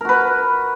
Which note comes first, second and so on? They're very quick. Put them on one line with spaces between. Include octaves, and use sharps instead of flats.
A#4 F#4 B4